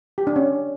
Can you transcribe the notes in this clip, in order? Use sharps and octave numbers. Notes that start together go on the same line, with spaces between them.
G4
D4
C#4